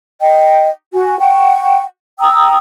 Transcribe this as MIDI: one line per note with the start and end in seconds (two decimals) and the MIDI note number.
0.21 0.70 75
0.21 0.70 79
0.93 1.18 66
0.93 1.18 80
1.19 1.82 78
1.19 1.82 79
1.19 1.82 85
2.19 2.57 79
2.19 2.57 82
2.19 2.57 87
2.19 2.57 88